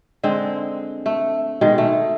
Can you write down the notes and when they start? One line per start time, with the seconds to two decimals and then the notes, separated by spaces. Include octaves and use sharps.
0.23 D3 G#3 C4
1.06 A3
1.61 B2 D#3 G#3
1.78 A3